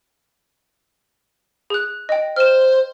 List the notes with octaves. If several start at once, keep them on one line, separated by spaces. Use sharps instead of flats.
G#4 F#6
D#5 G5
C5 F6 E7